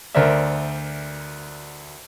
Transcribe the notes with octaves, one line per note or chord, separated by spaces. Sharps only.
D2 A#4 C5 D5 E5